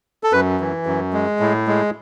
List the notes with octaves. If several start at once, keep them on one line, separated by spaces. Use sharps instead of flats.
A4
F#2 B4
E3
F#2
G#3
A2
G#3